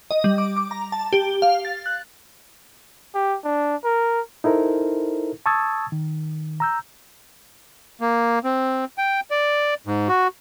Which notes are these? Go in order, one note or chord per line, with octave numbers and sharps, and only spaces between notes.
D#5
G3
D6
D6
A#5
A5
G4
F5
A6
F#6
G4
D4
A#4
D#4 E4 A4 A#4 C5
A5 C#6 D#6 E6 G#6 A6
D#3
A#5 E6 G6
A#3
C4
G5
D5
G#2
F#4